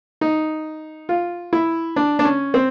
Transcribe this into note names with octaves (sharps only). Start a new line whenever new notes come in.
D#4
F4
E4
D4
D4
C#4
C4